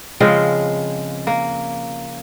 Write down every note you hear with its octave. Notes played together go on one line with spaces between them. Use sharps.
C#3 F3 G#3 C4
A#3